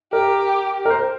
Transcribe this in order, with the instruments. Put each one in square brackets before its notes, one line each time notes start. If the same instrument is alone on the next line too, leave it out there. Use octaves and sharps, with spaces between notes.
[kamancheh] G4 [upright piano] A#4
[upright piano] A#4
C5